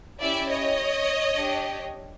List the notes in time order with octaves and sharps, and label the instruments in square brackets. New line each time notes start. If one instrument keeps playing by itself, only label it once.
[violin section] C#4 E4 G4 D5 E5
C#5 D#5
D4 G4